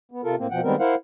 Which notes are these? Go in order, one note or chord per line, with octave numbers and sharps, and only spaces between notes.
B3
C3 F4 A4 A#4
A2 A#3 C4
B2 F3 F#5 G5
D#3 G3 G#3 B3 C4 A#4
E4 A#4 C5 F5 F#5